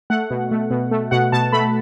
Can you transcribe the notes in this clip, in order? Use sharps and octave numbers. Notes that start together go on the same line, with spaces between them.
A3 F#5
B2
A3
B2
A3
B2 F#5
B2 A5
A3 B5